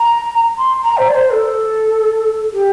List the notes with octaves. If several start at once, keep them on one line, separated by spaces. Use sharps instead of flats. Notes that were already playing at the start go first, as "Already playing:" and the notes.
Already playing: A#5
C6
A#5
C5
D5
C5
A4
G4